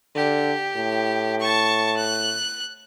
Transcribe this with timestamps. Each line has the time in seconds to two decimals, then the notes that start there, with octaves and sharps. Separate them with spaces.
0.16 D3 G4
0.76 A2
1.40 A5 C#6
1.96 F#6